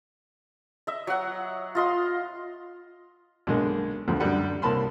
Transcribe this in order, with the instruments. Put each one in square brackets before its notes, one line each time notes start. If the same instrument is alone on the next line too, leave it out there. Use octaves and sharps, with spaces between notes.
[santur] D#5 E5
F#3 F#5
F4 D#5 C6
[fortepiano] B1 D3 G#3 A#3
D2 G2 F3 A3
F#2 D3 G3 F#5
C2 A#3 A5 B5 C6